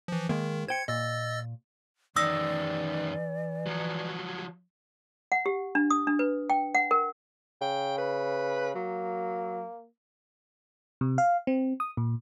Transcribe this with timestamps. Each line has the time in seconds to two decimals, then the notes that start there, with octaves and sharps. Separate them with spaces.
0.08 E3 F3
0.29 D#3 G#3 A#3
0.68 C5 G5 G#6 C#7
0.88 A#2 D#5 E6 A6
2.16 F#2 D#3 E3 D5 D#6 E6 A#6
3.66 F3 F#3
5.32 F#5
5.46 G4
5.75 D4
5.90 D#6
6.07 D4
6.19 B4
6.50 G5
6.75 F#5
6.91 A#4
7.61 C#3 G5
7.98 B4
8.75 F#3 A#3
11.01 C3
11.18 F5
11.47 C4
11.80 D#6
11.97 A#2